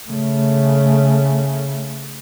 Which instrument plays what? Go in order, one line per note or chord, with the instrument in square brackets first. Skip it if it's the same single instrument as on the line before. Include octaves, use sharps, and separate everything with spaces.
[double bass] C#3 A3